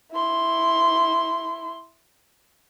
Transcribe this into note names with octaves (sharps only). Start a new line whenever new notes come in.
E4 C6